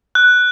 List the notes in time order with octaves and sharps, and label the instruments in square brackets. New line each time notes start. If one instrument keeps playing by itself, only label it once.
[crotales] F#6